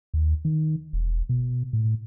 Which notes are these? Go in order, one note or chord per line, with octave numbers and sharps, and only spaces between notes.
D#2
D#3
E1
B2
A2